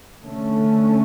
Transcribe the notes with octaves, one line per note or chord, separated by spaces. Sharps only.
D3 A3 C#4